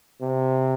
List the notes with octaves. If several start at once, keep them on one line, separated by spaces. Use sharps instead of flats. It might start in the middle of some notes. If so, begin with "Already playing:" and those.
C3